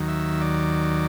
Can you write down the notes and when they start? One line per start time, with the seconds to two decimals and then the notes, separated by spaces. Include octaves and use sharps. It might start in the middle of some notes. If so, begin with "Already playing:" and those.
Already playing: D#2 D#3 F#3
0.08 E5
0.41 D5